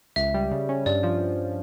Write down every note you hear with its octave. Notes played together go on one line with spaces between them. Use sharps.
C#2 E5
G3
C#3
C#4
G2 D5
F3